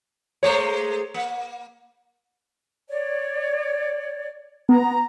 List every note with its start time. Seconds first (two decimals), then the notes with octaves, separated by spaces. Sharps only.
0.43 G#3 A3 C5 C#5
1.14 A#3
2.89 C#5 D5
4.69 B3 A#5